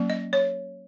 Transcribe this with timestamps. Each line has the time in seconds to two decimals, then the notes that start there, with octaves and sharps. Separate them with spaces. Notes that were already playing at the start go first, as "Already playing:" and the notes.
Already playing: F#3 A#3 C#4
0.10 D#5
0.33 C#5